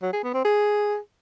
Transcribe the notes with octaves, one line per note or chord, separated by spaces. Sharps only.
F#3
G#4
B3
C4
G#4